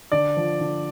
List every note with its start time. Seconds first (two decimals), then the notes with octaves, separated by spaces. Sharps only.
0.12 D3 D5
0.37 F3
0.60 D3